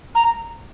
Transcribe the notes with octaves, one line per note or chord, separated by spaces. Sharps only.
A#5